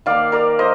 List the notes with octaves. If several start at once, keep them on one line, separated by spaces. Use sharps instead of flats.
D#3 A#3 D5 F5
A#4 D5
C5 D#5